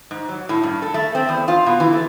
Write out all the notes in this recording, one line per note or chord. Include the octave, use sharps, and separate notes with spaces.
G#2
F#3
A2
G2
A4
A3
C4
E2
F4
B2
E3
A3